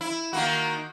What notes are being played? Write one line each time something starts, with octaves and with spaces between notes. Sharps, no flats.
E4
D#3 A#3 F#4